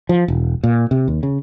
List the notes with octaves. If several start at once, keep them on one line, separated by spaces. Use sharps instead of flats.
F3
E1
A#2
C3
D#2
C#3